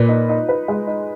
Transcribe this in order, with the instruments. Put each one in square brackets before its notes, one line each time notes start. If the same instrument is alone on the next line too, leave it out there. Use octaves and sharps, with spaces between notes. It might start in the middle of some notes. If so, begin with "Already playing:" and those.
Already playing: [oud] A#2 [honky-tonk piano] B4
[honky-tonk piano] D#4
D#4
B4
G#3
D#4